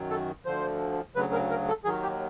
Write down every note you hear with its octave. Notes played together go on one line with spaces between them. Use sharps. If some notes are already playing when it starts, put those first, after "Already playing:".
Already playing: F#2 D#3 F#3
A4
D2 D3 F3 C5
D2 C#3 F#3 B4
A#4
A#4
A4
D#2 D#3 F#3 G#4
G4